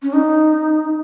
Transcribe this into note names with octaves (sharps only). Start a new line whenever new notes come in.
C#4
D#4